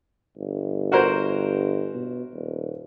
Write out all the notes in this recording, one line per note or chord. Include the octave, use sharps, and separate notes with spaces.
G1
F#4 A#4 C5
B2
D#1